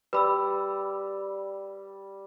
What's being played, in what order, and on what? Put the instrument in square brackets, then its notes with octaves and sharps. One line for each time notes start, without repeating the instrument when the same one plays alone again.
[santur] G3 [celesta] B4 B5 E6